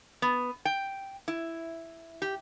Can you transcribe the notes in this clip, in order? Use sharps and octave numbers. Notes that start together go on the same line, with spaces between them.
B3
G5
E4
G4